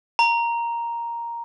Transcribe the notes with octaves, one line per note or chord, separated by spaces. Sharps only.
A#5